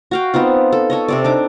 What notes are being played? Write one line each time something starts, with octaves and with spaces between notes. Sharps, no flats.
F#4 F5 G5
B3 C4 D#4 F4
A4
A4 C#5 D#5
C3 C4 D5
D4 D#4 D6